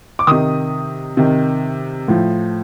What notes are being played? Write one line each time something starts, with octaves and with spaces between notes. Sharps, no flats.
D6
C3 D#3 D#6
C3 D#3
A2 F3